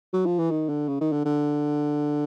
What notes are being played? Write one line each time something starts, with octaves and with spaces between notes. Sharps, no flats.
F#3
F3
E3
D#3
D3
C#3
D#3
D3
D3